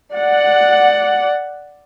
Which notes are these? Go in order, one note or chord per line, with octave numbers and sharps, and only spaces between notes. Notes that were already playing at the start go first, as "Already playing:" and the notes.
D5 F#5